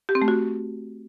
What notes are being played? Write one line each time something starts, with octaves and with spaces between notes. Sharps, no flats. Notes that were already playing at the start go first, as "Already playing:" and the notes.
G4
C4
A3
F#4